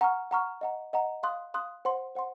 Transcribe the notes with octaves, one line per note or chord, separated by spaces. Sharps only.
F#5 A#5 C#6 F6
F#5 A#5 C#6 F6
D#5 F#5 A#5
D#5 F#5 A#5
F5 C6 D#6 F#6
F5 C6 D#6 F#6
C5 F#5 C6
C5 F#5 C6